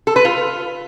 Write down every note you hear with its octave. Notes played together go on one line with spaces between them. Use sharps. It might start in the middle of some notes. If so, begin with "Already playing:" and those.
A4
B4
F4